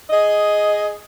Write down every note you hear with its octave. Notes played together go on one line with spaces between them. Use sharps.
G#4 D#5